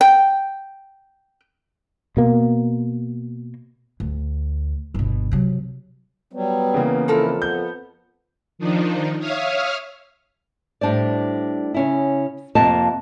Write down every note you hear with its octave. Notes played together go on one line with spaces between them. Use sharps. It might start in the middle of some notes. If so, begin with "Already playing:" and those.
G5
B2 A#3
D2
G1 B2
C3 F#3
F#3 G3 B3
C#3 E3 A#3
F2 E4 F4 A4 A#4
B3 G6
D#3 F3 D4 D#4
C#5 E5 F5 D#6 F6
A2 G3 D4 C5 D5
C#3 C#4 E4
F2 C3 A#3 D#5 F5 A5